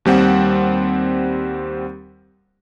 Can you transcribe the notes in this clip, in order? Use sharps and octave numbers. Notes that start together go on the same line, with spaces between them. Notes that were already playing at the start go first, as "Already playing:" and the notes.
D#2 G3 C4 F#5